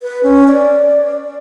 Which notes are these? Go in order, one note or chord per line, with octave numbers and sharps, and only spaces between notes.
B4
C#4
D5